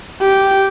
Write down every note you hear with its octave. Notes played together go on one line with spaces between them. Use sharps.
G4